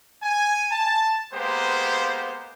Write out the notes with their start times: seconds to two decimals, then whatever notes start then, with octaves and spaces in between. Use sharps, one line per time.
0.22 G#5
0.71 A5
1.33 G#3 A#3 B3 G4 B4 C5